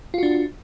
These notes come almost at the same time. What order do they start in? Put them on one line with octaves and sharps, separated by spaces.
F4 F#4 D4